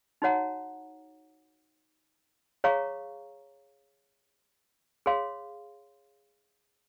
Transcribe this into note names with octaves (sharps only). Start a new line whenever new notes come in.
D#4 F#4 C#5 F#5 A#5
G#4 C#5 F5 A#5 C#6
G#4 C#5 F5 C6